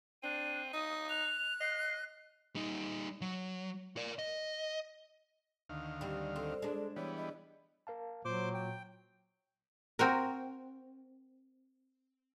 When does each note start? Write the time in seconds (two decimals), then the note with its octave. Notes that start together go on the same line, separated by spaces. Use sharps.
0.23 C4 D4 D#7
0.73 D#4 D#6
1.09 F#6 F7
1.60 D#5 C7
2.55 G3 D#4
3.21 F#3
3.97 A#4 D5
4.19 D#5
5.69 D2 D#3 F5
6.01 G3 C4 G4
6.36 C4 A4
6.62 G#3 D4
6.96 E3 G3 B3 C#5
7.16 D#5
7.87 A#4 F5 A5
8.25 A#2 F#3 C5 D6
8.54 G5
9.99 C4 F#4 A#4